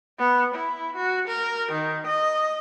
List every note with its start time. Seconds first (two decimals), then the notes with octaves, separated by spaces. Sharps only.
0.18 B3
0.55 E4
0.95 F#4
1.28 A#4
1.72 D#3
2.07 D#5